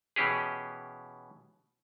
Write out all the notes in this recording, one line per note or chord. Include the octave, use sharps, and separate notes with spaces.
B2 E3 C#4 G4 G#4